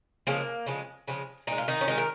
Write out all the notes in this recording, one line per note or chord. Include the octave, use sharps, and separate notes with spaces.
C#3 F3 G#3 A#3
C#3 F3 G#3
C#3 F3 G#3
A#2 G#3 D#4
F4
D#3 D#4
C#4
A#2 D#3 G#3 D#4
A#4